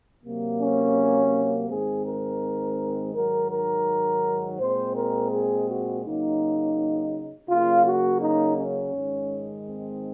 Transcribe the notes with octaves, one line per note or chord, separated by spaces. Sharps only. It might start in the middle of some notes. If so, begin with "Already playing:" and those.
C3 F#3 A#3
C#4
G#2 D#3 G#3 C4 G#4
A#4
G#2 D#3 F#3 A#4
A#4
A#2 G#3 C4 C5
A#4
G#4
F#4
C#3 F#3 A#3 D#4
C#3 F#3 A#3 F4
F#4
D#4
C#4
G#2 D#3 G#3
C4